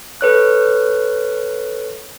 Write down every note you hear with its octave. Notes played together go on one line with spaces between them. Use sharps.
A4 B4 C#5 F#6